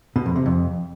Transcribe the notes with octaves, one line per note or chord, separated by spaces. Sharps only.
B2
F2
C3
F2